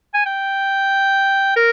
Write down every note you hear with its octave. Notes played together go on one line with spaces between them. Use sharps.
G#5
G5
A#4